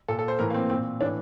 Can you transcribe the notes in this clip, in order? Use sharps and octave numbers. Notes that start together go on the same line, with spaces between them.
A#2 A4
A4
C5
A2 E3 A#4
A#3
C4
A#2 C4
A2 E3 D4